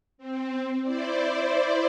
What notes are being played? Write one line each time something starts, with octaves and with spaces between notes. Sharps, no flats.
C4
E4 C5 D5